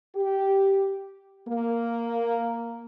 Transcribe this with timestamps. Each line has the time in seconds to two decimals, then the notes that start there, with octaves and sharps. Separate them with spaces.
0.16 G4
1.48 A#3